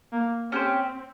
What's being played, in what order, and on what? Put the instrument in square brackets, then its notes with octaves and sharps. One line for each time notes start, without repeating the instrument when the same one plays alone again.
[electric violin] A#3
[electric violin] C4 [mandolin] C#4 G4 C5